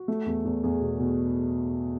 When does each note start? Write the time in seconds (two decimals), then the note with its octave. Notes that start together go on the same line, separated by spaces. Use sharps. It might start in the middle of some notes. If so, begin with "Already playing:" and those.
Already playing: F#4
0.08 A3
0.26 E2
0.45 E2
0.64 E2 G#4
0.81 B2
1.00 B2